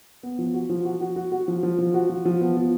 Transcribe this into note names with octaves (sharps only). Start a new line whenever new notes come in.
B3
F3
F#4
F3
F#4
F#4
F#4
F#4
F3
F3
F3
F#4
F3
F3
B3
F3